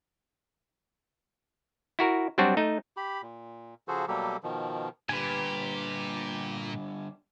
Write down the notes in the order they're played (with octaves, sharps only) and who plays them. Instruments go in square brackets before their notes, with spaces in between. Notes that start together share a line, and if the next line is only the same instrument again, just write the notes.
[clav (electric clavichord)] E4 F#4 A#4
F#3 G3 C4 D4 F#4
A3 D#4
[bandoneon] G4 B5
A#2
C#3 F3 F#4 G#4 A4 C5
B2 F#3 G3 A#3 G4 A4
B2 D#3 F3
[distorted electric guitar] A#2 [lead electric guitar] D3 G3 [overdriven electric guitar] G4 [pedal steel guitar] B4 G#5